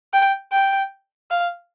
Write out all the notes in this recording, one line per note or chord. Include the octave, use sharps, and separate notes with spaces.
G5
G5
F5